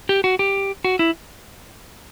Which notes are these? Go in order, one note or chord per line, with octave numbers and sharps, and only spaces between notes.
G4
F#4
G4
F#4
E4